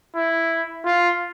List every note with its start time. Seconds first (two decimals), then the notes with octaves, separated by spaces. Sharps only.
0.16 E4
0.85 F4